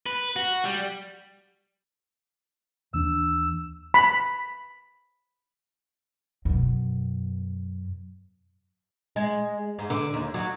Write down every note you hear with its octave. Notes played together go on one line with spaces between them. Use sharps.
B4
F#4
G3
D#2 E3 D4 E6
B5
F#2 B2
G#3
G#2
D3
D#2
F#3